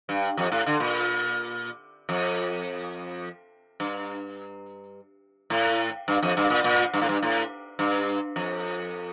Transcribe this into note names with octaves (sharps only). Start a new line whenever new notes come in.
G2
F2
A2
D3
A#2
F2
G2
A2
G2
F2
G2
A#2
A#2
G2
A2
G2
A2
G2
F2